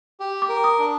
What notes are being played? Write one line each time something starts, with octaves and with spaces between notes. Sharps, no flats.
G4
D6
A#4
D#6
D4